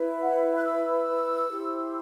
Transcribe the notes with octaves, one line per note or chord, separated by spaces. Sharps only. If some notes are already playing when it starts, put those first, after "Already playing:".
Already playing: E4 B4
F#5
F#6
E6
E4 G4 C5